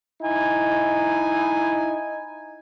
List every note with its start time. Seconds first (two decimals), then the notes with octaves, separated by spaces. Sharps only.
0.22 D#4 E4 G#5